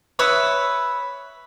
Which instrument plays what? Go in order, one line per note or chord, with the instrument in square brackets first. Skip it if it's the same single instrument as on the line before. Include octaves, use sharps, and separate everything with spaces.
[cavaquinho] B4 C#5 E5 D#6